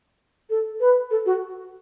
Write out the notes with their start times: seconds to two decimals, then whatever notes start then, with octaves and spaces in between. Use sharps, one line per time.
0.50 A4
0.80 B4
1.11 A4
1.26 F#4